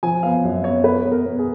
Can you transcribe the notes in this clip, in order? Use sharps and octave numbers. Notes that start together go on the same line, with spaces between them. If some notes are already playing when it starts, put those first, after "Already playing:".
F3 G#5
B3 F5
F#2
B3 C#5
B3 B4
B3
A#4
B3
G#4